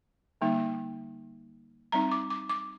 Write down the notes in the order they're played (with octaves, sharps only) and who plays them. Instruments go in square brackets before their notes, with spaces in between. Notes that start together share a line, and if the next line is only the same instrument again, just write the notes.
[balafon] D3 G3 A#3 D#4
G3 C4 D#4 A#5
D6
D6
D6